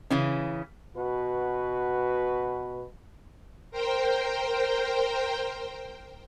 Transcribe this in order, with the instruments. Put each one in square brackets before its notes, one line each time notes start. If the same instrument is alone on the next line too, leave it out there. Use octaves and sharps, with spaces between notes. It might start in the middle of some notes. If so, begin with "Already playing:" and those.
[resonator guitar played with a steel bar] C#3 E3 C#4
[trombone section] B2 F#4 B4
[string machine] A#4 C5 G5